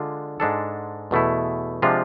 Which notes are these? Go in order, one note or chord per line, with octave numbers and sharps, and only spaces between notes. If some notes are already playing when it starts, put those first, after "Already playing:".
Already playing: D3 G#3 D4 F4
G#2 G#3 D4 A4
E2 B2 A3 E4
C3 F3 G#3 D4 F4